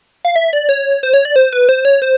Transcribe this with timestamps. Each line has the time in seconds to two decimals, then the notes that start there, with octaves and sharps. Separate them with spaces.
0.25 F5
0.36 E5
0.53 D5
0.69 C#5
1.03 C5
1.14 C#5
1.25 D5
1.36 C5
1.53 B4
1.69 C5
1.85 C#5
2.02 C5